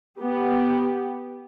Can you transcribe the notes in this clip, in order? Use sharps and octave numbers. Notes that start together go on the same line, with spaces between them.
B3 G4